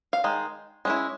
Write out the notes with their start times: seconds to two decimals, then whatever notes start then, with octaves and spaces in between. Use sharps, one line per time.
0.13 F5
0.24 D#3 G#3
0.85 G#3 C#4 E4